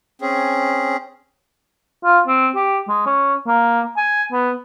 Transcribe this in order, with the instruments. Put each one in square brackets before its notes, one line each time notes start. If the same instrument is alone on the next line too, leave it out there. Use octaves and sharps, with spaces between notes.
[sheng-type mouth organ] C4 C#4 G#4
[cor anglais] F4
C4
G4
G#3
C#4
A#3
G#5
B3